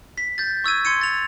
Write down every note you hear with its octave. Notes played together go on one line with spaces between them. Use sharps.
B6
G6 A6
C#6 E6 G#6 D#7
C6 G#6 C#7 D#7
A6 F7